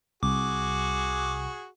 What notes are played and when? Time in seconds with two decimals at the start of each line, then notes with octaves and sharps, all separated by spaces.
0.23 C2 F#4 G#4 D6